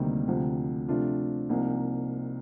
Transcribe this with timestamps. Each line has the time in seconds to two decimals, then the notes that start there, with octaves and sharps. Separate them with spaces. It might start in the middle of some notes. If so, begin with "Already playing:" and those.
Already playing: D2 C3 D#3 G3 A#3
0.28 D2 C3 F3
0.89 C3 F3 A3 D4 F4
1.49 C2 C3 F3 A#3 D#4